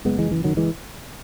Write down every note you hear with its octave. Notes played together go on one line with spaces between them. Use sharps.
F#1 G#3 B3
E3 G#3
F#2 E3
D#3 F#3
E3 G#3